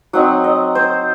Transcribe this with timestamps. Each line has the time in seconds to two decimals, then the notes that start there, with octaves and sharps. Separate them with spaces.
0.13 F#3 C4 D#4 F#5
0.44 D#5
0.75 C5